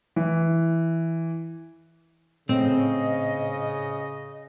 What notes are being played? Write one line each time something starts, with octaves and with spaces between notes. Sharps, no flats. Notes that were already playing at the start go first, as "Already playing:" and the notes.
E3
A2 C#3 C4 D#5